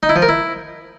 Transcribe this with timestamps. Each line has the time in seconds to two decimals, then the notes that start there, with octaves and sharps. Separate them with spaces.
0.03 D#4
0.09 E4
0.16 F3
0.22 A#4
0.29 E4